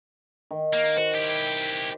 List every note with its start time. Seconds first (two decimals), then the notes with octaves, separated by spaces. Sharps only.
0.51 D#3
0.73 A#3
0.97 F#4 C5
1.14 E4 G4